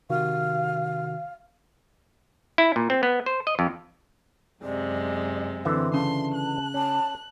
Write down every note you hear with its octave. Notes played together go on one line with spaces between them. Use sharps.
C3 D#3 F#4 F5
E4
A#2
C4
B3
C5
D#5
F2
F#2 C3 G#3 D5
D3 E3 C4 E5
C#3 A5 C6
F#6
C#4 A5